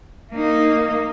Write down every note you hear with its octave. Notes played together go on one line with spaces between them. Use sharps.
A#3 D#4